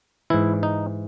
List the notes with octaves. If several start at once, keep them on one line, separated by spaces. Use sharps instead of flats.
G#2 E3 E4
D#4